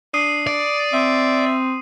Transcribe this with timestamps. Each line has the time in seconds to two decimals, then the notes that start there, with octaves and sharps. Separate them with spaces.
0.14 D4 D#6 C7 D#7
0.47 D5
0.93 C4 E5